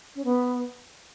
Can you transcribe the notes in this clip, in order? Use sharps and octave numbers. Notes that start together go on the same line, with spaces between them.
C#4
B3